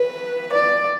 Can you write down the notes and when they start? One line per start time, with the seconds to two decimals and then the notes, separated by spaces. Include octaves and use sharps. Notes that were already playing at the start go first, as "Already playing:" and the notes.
Already playing: B4
0.52 D5